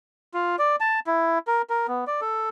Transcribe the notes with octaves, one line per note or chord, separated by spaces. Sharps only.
F4
D5
A5
E4
A#4
A#4
B3
D5
A4